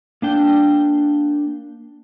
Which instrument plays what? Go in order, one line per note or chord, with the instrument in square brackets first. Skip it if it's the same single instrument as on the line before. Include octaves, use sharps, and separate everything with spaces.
[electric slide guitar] A#3 D4 G5